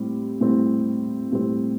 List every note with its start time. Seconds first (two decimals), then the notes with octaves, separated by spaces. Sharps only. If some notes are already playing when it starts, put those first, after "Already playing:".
Already playing: A2 G3 C4
0.41 A2 G3 C4
1.32 A2 G3 C4